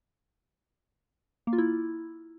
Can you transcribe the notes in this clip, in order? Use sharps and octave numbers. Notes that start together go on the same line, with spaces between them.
A#3
F4
E4